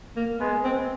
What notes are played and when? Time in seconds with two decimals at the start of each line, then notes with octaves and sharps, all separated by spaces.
0.16 A#3
0.40 G#3 B3
0.64 C4